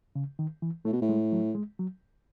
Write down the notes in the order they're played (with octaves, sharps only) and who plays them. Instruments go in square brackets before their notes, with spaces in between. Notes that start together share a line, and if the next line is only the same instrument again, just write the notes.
[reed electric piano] C#3
D#3
E3
[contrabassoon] A2 [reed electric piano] A3
[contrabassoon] B2
A2
[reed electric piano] G#3
F#3
G#3
F#3